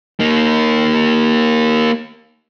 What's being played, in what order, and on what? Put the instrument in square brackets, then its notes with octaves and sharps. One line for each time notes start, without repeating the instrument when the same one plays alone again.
[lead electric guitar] A#3 D#4